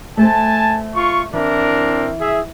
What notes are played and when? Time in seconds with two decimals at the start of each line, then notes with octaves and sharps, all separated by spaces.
0.17 A3 A4 C5 G#5 A5
0.94 F4 C#6
1.33 E3 C4 D4 A#4
2.20 G#4 E5